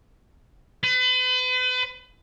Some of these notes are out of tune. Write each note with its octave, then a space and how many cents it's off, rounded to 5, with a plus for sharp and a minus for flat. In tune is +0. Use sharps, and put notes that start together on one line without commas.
B4 +40